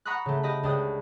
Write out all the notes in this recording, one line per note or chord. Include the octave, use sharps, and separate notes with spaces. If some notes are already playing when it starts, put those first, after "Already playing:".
F#5 A#5 B5 C#6 D#6 F#6
C#3 A3
G4 D#5 B5
C#2 D4 G5 D#6